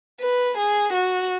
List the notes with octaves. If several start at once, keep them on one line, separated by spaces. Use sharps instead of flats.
B4
G#4
F#4